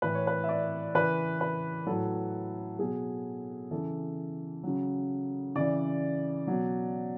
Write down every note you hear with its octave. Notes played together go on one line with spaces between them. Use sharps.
A2 E3 B4
C#5
B4
E5
D5
C#3 E3 B4
B4
A2 F#3 A4
B2 F#3 G#4
C#3 E3 A4
C#3 F#3
C#3 E3 D5
B2 F#3